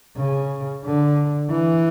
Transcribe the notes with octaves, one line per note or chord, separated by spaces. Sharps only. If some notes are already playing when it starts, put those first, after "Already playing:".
C#3
D3
E3